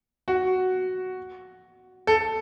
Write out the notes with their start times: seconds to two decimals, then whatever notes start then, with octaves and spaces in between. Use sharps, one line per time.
0.28 F#4
2.07 A4